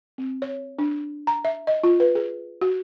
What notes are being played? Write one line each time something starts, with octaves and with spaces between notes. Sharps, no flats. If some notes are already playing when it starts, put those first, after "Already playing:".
C4
C#5
D4
A#5
E5
D#5
F4
B4
G#4
F#4